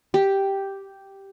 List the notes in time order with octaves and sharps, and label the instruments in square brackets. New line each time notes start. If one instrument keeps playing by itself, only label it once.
[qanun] G4